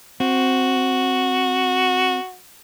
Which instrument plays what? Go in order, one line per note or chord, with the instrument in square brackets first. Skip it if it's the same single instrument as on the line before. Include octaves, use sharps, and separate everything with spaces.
[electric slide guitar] C4 [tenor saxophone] F#4